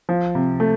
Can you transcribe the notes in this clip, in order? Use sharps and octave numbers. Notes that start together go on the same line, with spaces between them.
F3
C3
A3